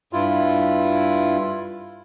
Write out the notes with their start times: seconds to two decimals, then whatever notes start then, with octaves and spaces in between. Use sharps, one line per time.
0.13 G2 E4 F4